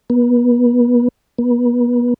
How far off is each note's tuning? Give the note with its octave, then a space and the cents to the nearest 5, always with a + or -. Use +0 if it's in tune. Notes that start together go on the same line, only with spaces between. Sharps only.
B3 -30
B3 -30